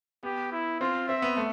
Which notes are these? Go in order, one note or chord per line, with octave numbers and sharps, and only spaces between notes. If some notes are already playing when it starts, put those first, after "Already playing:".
B3 G4
E4
C4 F4
C4 E5
B3
A3